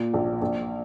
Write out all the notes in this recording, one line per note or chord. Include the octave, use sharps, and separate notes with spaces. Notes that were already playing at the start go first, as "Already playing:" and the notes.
Already playing: A#2
A#1
A#1